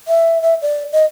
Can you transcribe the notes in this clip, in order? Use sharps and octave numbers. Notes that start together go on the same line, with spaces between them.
E5
E5
D5
D#5